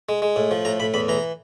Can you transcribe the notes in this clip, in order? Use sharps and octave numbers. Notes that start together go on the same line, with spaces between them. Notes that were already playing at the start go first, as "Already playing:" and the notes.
G#3
G#3
A2
F3
A2 A#5
A2 B5
E2 B5
E3 A#5